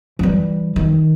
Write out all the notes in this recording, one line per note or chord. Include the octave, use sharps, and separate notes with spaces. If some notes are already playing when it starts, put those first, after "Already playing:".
E3 G3
D#3